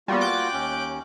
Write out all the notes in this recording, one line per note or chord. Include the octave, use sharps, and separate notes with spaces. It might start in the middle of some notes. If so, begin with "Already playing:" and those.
G3 A#3 B3 F4 F#4
G5 D6 F#6
D#2 C#4